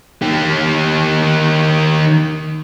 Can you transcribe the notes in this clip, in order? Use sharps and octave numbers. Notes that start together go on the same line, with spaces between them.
D#3 G4